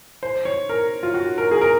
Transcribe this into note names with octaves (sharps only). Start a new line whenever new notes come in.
C5
C#5
A#4
F4
F#4
A#4
G#4
A#4